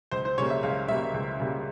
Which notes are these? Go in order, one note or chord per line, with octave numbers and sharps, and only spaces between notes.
C#2 C5
C5
C#3 G3 A#3 C#5
E5
C#2 F5
C#3 G3 A#3 E5
C#2
C#3 G3 A#3